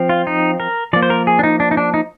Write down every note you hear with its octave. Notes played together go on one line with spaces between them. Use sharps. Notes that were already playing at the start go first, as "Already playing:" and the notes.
Already playing: F3 C4
F4
D#4
A#4
F3 A#3 D5
C5
A#4
G#4
D4
D#4
D4
D#4
D4
D#4